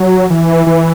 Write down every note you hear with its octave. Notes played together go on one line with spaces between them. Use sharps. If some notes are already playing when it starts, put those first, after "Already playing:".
Already playing: F#3
E3
E3